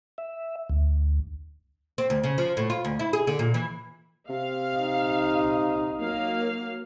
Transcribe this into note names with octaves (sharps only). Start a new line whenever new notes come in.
E5
D2
C4
D2
C#3
F3
A2
F4
D2
E4
G#4
D3
A#2
E3
C3 F5
D#4
F#3 A#3 F5